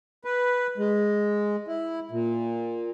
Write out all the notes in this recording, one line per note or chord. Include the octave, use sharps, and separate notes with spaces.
B4
G#3
E4
A#2